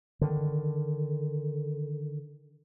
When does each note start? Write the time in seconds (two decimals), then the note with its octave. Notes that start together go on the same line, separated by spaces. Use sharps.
0.21 D3 D#3